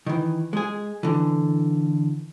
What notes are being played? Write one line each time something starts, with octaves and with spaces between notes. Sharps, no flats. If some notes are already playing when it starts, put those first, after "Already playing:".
D#3 E3
G#3 G#4
D3 E3